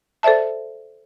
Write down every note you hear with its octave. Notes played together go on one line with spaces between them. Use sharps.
A4 C5 D5 E5 A5